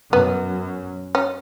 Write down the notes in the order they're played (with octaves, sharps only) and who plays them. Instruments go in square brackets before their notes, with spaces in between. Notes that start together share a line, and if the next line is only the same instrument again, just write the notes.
[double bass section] F#2 [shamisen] B3
[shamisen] C#4